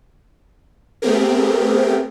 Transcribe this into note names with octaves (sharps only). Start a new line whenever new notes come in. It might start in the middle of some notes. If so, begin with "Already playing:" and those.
A3 B3 C4 G4 G#4 A#4